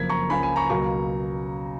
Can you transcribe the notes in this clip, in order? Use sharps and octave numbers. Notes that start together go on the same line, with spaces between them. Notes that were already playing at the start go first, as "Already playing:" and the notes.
Already playing: F#1 F2 F3 A#3 G#6 B6
A#5 C#6
C#2 C#3 F3 A#3 G#5 B5
G#5 B5
A#5 C#6
C#2 B2 F#3 A#3 A#5 C#6